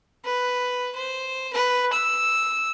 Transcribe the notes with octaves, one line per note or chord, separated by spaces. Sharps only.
B4
C5
B4
E6